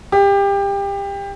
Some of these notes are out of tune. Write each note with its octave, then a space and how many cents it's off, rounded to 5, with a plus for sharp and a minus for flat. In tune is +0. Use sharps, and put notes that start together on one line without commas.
G4 +25